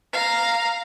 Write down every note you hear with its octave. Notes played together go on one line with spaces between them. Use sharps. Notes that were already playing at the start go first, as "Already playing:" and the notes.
F5 A#5